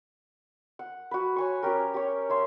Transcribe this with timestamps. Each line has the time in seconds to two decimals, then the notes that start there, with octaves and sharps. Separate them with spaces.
0.79 F#5
1.11 F#4 B4
1.36 C#5 G#5 C#6
1.63 C#4 G4 A#4
1.94 G4 C#5
2.29 C#5 E5 C6